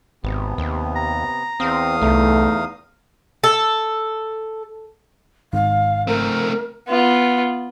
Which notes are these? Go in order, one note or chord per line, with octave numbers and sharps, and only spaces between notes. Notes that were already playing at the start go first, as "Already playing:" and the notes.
G#1 C3 B3
D#2
A#5
E2 C4 F5 D#6
C2 A3 D#4
A4
G#1 G#2 D#3 F5
A3 C4 A#4
B3 F4